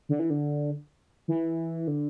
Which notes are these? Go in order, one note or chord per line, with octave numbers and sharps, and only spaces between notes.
D3
E3
D3
E3
D3